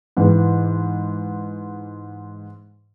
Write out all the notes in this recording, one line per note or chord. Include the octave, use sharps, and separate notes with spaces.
G#2 E3